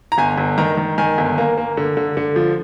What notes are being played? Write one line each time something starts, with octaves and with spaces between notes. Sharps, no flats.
A#5
G1 G#5
G1
D#3 A#5
D#3
D#3 G#5
G1
A#3
A#3
D3
D3
D3
F3